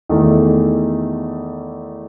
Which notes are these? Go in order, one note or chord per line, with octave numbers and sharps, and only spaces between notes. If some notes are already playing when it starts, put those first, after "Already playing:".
E2 D#3 A3